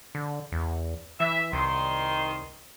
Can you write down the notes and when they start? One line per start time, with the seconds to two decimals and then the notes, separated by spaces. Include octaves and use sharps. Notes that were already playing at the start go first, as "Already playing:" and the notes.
0.15 D3
0.52 E2
1.20 E3 E5
1.53 C2 D#3 C6